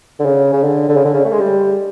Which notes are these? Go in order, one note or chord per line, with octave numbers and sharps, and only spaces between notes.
D3
C#3
C#3
D3
D3
C#3
D3
C#3
A3
G#3
G3